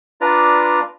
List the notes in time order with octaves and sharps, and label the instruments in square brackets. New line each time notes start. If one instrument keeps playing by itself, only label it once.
[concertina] D4 F4 B4 D5 A#5